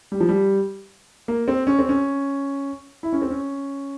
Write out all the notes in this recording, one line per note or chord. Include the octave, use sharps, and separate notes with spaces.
G3
F3
G3
A#3
C4
C#4
C4
C#4
E4
C#4
C4
C#4